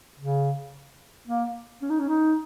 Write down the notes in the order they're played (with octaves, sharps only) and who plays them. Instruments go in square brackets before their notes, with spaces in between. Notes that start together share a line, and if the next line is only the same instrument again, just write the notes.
[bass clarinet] C#3
A#3
C#4
D#4
C#4
D#4